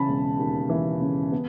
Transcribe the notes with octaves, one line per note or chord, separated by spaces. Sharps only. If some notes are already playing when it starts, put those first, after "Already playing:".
Already playing: C#3 E3 A5 B5
E1
D#2
E3
C#3
B3